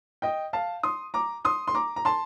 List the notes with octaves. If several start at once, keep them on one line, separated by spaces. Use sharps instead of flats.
D#5 G5
F5 A5
C6 D#6
A#5 D6
C6 D#6
C6
A#5 D6
A#5
A5 C6